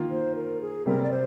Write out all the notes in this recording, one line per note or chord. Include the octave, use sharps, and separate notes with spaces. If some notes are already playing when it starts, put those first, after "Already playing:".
Already playing: D#3 A#3 F4
C5
A#4
G#4
C3 G3 C4 A#4
D5
C5